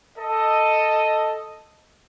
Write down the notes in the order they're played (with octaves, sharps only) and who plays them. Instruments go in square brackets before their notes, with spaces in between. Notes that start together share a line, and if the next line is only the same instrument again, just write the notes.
[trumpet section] A4 D#5